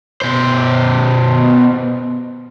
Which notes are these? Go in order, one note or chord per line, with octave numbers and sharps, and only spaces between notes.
B2 C5